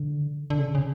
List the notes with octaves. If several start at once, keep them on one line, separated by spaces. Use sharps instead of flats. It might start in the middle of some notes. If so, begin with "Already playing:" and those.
Already playing: D3
D3
C#3
C#3